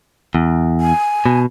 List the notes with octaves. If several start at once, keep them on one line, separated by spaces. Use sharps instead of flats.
E2
G#5
B2